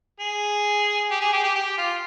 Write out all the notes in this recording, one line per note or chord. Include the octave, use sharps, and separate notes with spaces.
G#4
G4
G#4
G4
G4
G4
F4